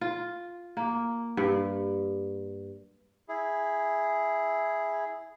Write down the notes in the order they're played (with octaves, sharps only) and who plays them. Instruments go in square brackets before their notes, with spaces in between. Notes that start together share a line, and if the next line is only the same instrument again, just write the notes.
[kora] F4
A#3
G2
[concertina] E4 G#4